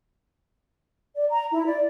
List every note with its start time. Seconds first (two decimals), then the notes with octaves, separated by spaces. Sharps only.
1.16 D5
1.30 A#5
1.51 E4
1.65 D5